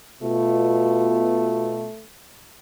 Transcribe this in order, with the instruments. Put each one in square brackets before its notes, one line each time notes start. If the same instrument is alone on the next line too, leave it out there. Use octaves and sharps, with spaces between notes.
[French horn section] B2 F4 [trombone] A3